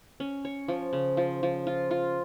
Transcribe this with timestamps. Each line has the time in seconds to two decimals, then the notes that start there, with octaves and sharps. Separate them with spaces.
0.20 C#4
0.45 C#5
0.68 F3
0.93 C#3
1.17 F3
1.43 F3
1.67 F4
1.91 F4